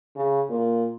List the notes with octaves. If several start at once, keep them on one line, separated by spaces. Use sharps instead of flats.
C#3
A#2